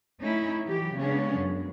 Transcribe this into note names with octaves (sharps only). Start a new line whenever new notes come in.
A3 C#4 D#4 E4
E3 F#3 G4
C#3 G#3 B3 C#4 D4
F#2 G#3